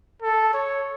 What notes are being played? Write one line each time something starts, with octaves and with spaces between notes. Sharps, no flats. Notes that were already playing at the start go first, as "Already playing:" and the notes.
A4
C#5